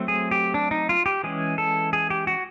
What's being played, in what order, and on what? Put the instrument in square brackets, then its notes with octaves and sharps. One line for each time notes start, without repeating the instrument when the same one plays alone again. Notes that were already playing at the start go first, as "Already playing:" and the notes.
Already playing: [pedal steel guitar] F#3 A3 C4
G#4
G4
D4
D#4
F4
G4
E3 G#3 C#4 G#4
A4
G#4
G4
F#4